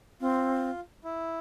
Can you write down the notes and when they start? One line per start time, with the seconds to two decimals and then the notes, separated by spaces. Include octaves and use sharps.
0.21 C4 F4
1.04 E4